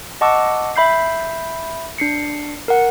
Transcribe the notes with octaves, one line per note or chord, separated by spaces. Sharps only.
D#5 F#5 A5 C#6 D6 E6
E5 B5 G6 C7
D4 C7 C#7
A#4 F#5